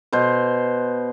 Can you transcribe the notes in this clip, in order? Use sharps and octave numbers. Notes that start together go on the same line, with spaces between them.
B2 C5